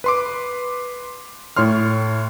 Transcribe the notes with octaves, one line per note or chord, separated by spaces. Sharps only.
B4 C6 D6
A2 C#5 C6 F6